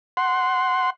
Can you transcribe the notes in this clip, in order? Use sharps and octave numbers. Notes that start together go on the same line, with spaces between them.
F#5 C6